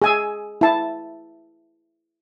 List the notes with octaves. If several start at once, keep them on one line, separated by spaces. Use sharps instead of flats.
G#4 G#5 E6
E4 A5